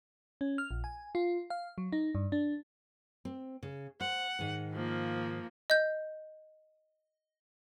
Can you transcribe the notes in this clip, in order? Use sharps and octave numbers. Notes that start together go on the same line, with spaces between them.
C#4
F6
A#1
G#5
F4
F5
F#3
D#4
G2
D4
C4
C#3
C5 F#5
G#2 D#3
F3 A#3
D#5 G6